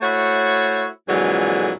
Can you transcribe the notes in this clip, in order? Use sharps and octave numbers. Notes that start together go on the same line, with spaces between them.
A3 E4 F#4 C5 C#5
F2 A#2 D3 E3 F#3 G#3